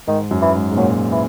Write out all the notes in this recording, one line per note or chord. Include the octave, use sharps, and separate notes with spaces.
G#2 D#3
F#2
E3
G#2
G#2
A#2 F#3
E3